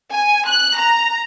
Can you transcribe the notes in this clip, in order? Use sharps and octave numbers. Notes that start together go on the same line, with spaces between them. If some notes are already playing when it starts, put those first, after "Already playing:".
G#5
F#6
A#5